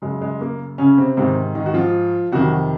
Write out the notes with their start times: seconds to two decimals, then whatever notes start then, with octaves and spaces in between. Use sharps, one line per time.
0.02 F#2 C#3 G#3
0.22 G#3
0.41 A#3
0.78 C#3 C#4
0.97 C3 C4
1.17 G#2 C3 D#3 C4
1.55 D#3 D#4
1.66 F#4
1.74 F3 F4
2.32 F2 C3 D#3 F#3 F#4